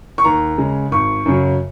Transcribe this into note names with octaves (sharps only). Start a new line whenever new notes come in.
C#6
D#2 A#5
C#3 G#3
G#1 C#6
F#2 C#3 F#3